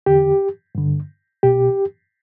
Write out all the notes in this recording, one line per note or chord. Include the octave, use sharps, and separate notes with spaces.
E2 D3 G4
G2 D3
C2 B2 G4